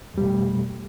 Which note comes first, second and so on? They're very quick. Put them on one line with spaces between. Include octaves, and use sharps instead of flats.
F2 G3 B2 A3